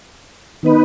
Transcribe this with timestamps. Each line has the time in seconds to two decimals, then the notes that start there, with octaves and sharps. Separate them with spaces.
0.63 D#3 B3 D#4 B4